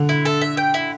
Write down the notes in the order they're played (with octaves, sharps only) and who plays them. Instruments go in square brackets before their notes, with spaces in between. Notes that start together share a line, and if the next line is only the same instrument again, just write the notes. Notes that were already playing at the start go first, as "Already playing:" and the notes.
Already playing: [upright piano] D3
[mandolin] E4
A4
E5
G5
E4